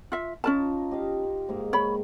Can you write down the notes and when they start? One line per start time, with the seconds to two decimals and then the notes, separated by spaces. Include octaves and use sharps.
0.12 F4 E5
0.44 C#4 D#4 F4 A#4 A5 A#5
0.91 G4 D#5 F5
1.49 G#2 A#3
1.73 C#5 B5